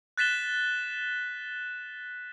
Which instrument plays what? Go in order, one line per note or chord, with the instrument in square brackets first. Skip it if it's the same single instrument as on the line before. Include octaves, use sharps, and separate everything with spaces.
[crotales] F#6 A6 B6 E7 G7